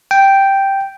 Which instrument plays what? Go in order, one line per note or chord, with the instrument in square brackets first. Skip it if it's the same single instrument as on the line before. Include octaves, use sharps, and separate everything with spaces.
[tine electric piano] G5